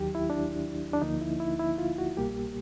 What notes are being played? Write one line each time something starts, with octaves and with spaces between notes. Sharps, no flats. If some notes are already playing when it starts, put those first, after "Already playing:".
Already playing: D#2 D#3 F#3 G4
E4
D4
D4
D2 D3 F3 A#3 D#4
E4
E4
E4
F4
F#4
C2 B2 G3 A#3 G4